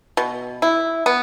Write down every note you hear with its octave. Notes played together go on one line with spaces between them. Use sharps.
B2
E4
B3